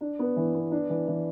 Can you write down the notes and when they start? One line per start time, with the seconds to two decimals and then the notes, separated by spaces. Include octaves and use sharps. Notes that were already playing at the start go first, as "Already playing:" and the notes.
0.01 D4
0.19 B3
0.37 E3
0.54 B3
0.71 D4
0.89 E3
1.08 E3